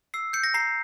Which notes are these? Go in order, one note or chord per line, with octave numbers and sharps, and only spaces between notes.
E6 C7
G6 C#7
A#6
A#5 C7